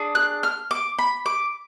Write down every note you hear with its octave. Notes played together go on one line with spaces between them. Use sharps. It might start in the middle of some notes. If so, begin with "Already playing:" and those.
Already playing: D4 G#4
F#6
F6
D6
B5
D6